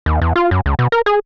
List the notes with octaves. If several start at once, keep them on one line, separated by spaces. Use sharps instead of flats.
D#2
E2
F4
F#2
C#2
B2
A#4
G#4